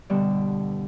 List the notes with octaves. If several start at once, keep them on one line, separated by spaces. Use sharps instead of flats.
G2 B2 D3 G3